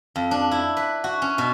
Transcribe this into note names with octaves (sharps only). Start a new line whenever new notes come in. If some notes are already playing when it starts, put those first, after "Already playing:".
F2
D4
E4
B4
F#4
C#4
B2